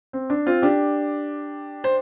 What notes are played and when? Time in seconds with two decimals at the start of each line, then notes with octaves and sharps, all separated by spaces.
0.13 C4
0.30 D4
0.46 C4 F4
0.62 D4 G4
1.84 C5